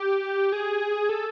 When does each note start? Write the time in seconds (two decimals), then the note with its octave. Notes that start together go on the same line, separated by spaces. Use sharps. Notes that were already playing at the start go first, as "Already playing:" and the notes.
Already playing: G4
0.52 G#4
1.09 A4